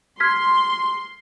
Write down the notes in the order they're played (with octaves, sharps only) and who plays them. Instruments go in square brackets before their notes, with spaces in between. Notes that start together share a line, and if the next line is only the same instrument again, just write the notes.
[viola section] C6 [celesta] F6 G#6 B6